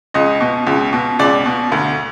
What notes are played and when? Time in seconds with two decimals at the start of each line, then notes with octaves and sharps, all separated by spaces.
0.14 C#2 D#5
0.41 B2
0.67 C#2
0.93 B2
1.19 C#2 D5
1.46 B2
1.72 D2